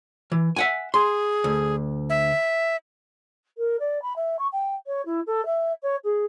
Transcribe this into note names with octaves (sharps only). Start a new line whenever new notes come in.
E3
E5 F#5 G#5
G#4 C6
D2
E5
A#4
D5
B5
E5
C#6
G5
C#5
E4
A4
E5
C#5
G#4